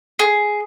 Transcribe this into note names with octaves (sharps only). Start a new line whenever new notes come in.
G#4